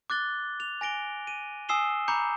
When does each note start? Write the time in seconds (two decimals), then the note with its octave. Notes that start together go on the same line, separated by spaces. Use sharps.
0.10 D6 F#6 A6 G7
0.60 F7
0.81 G#5 A#6 D7 G7
1.27 D#7
1.69 G#5 D#6 E6 C7 E7 G7
2.08 A#5 B5 D6 G6 C#7